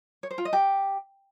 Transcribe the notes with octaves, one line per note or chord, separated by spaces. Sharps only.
C#5
C5
F4
D#5
G4